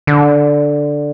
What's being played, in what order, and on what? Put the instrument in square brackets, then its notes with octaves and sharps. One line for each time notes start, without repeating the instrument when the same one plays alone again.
[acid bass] D3